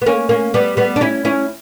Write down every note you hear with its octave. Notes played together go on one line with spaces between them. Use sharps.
B3
A#3 C#4
A#3 C#4
G3 B3
G3 B3
D4
C#4 E4
C#4 E4